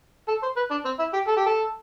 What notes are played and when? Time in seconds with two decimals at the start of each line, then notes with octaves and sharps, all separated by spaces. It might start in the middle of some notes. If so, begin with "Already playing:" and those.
0.28 A4
0.43 C5
0.56 B4
0.71 D4
0.85 C4
0.99 E4
1.14 G4
1.27 A4
1.37 G4
1.46 A4